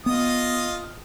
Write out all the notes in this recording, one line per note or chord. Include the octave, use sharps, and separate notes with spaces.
B3 F4 D#5 D#6